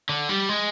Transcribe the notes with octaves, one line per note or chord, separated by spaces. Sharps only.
D3
G3
G#3